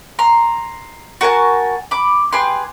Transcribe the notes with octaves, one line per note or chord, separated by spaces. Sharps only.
A#5 C6
F#4 A#4 G#5 A5
B5 D6
G4 G#4 B4 C6